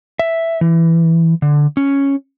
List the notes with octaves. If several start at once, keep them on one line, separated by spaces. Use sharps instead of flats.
E5
E3
D3
C#4